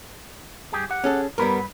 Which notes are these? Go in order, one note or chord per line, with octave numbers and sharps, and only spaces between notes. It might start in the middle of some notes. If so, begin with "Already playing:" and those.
G2 G4 G#4
G4 F#5
C#4 G#4 A4
G2 G3 B3 A#4 B4